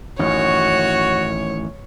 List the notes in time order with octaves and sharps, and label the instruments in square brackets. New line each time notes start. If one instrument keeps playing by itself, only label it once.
[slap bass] A1 F#2 D#3 [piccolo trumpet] F#4 [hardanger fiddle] C#5